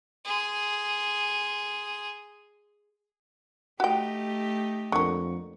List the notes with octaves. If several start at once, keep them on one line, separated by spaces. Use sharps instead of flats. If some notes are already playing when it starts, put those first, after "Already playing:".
G#4 C6
A3 D#4 F#4 G4 G5
F2 D3 A#3 C#6